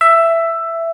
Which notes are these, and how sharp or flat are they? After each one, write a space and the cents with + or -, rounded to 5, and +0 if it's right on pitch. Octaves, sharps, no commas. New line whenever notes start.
E5 +10